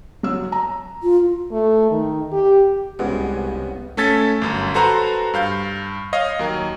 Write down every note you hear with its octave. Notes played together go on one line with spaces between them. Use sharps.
F#3 E6
A#5
F4
A3
D#3
G4
C2 G2 G#3 B3 C#4 F#4
A3 C#4 A4 G#6 A6 B6
G1 F#2
F#4 A4 B4 C5 A#5 C6
G2 F5 G6
C#5 D#5 F5
D#2 F#3 A#4